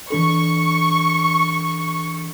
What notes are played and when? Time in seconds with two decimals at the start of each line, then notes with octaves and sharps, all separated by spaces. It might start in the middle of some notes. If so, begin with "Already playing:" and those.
0.10 E3 D4 A4 C#6